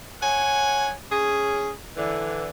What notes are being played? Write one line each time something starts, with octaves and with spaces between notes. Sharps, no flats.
C#5 F#5 G#5
C#4 G#4
D3 E3